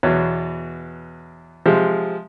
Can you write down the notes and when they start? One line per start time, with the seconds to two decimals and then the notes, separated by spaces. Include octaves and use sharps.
0.03 E2 B2 C#5
1.66 C3 F3 G#3